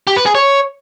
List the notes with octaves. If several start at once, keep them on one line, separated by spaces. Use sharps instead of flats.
G4
B4
G#4
C#5